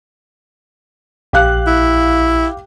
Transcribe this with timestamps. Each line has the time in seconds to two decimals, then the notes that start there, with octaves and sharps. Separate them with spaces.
1.33 A#1 G4 F5 F#6
1.67 E4